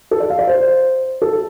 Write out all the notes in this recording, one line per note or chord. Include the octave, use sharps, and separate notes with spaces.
A4
D5
F5
D5
C5
A4